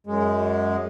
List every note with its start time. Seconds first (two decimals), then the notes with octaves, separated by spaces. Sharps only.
0.07 F#2 G#3